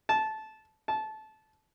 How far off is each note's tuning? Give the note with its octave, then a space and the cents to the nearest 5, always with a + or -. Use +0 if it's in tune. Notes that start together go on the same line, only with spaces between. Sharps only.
A5 -15
A5 -20